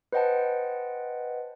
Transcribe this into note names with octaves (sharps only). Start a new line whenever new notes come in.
B4 C5 D#5 F#5 G5 A5